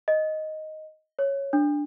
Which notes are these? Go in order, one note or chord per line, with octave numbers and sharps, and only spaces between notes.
D#5
C#5
D4